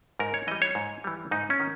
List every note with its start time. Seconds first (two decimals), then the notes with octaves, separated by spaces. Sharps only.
0.19 G#2 A#4
0.34 C#5
0.47 E3 G3 D#5
0.62 C#5
0.75 G#2
1.04 E3 G3
1.31 G#2 D#4
1.50 C#4
1.60 D#3